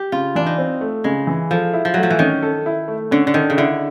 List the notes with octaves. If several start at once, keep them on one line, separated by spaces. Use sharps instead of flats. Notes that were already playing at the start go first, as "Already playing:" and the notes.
Already playing: G4
C#3 F4
E3 D4
D#4
C4
A3
C#3 G#3
E3
F3 A4
E4
F3
F#3 A3
F3
E3
D#3 C#4
A4
E4
A3
D3 C#4
D3
D#3 A4
C#3
D3 E4